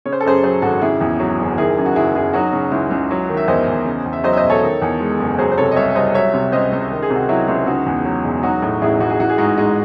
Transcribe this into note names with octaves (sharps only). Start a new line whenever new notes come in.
C#3 C#5
C5
A4
F#2 G#4 C5
F#3 G#4 C5
G#1 F#4 A4
C#3 E4 G#4
E2
F#3
F#1
D#3 E4 G#4
F#2
F#4
F#1 E4 G#4
F#1 E4 G#4
F#3 D#4 F#4
C#3
C#2 E4
C#2
F#3
D#3
E5
E2 C5 D#5
E2
C#3
E2
E5
F#3 C5 D#5
E5
C5 D#5
E1
A4 C#5
D#3
E2
G#3
F#1
F#3 G#4 C5
C5
C3 A4 C#5
D#5
C2 C#5 E5
C2 C5 D#5
F#3 C#5 E5
C3
C#2 C5 D#5
C#2
D#3
G#4
C3
F#4
F#3 E4
C#2 E4
C#3 D#4 F#4
E2
F#3
E1
F#3 D#4 F#4
A2
A1 E4 G#4
A1 F#4
G#4
E3 F#4
G#4
G#2 D#4 F#4
G#3 D#4